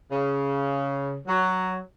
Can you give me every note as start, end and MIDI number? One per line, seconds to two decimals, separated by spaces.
0.12 1.16 49
1.27 1.77 54